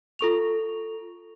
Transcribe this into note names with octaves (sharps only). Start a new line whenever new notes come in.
F4 A4 C#6 F7